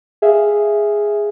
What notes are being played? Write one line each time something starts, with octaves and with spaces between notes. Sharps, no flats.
G#4 E5 F5